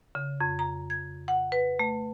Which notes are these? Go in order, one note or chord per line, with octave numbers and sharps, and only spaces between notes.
C#3
F2
A#5
G#6
F#5
B4
A3